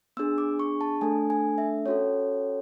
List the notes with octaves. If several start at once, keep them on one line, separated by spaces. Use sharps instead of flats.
B3 D4 G#4 E6
D6
C#6
A5
A3 D4 A4 G#5
G#5
E5
C#4 F#4 A4 C#5